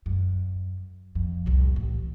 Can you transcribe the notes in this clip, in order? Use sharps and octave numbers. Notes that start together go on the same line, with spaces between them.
F#2
F2
C2 A#2
A1